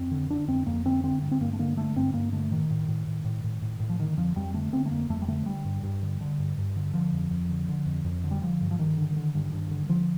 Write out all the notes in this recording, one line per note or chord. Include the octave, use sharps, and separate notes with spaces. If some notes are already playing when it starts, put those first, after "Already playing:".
Already playing: F2 C4
D3
D3 D4
F2 C4
F2 A#3
D3 C4
D3 C4
G2
C4
G2 A#3
A3
D3 A#3
D3 A3
G2 C4
G2 A#3
D3 A3
A2 D#3
A2
A2
A2
A2
A2
A2
A2
F3
D3 D#3
F2 F3
F2 G3
D3 A3
D3 C4
A3
F2 A#3
F2 A3
G3
D3 A3
D3 G3
G2
G2
D3
D3
G2
G2
D3
D3 F3
F2
F2
D3
D3
F2
F2
D3
G3
D3 F3
G2
F3
G2 D#3
D3
D3
G2
G2
D3
D3 F3